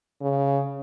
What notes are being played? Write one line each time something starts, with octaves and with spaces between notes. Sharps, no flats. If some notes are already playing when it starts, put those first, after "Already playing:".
C#3